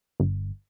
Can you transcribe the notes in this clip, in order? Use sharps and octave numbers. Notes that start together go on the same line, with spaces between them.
G1